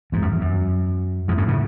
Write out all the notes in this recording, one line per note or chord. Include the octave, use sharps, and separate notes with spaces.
E2 G#2
F#2
E2
F#2
E2 G#2
F#2 A2
A2 C#3